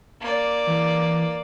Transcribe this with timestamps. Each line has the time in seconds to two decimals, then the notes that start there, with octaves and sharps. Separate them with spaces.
0.20 A#3 D5
0.67 E3